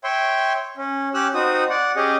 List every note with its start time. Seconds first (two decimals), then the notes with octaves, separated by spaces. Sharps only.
0.04 C#5 E5 G5 C6
0.77 C#4
1.14 C#4 G4 E6 F#6
1.34 C4 D#4 F#4 D#6
1.70 D5 F#5
1.96 C#4 G4 G#4 D#5